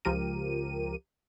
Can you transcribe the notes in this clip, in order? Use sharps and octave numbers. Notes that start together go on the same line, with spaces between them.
C#2 F3 G4 A#4 D#7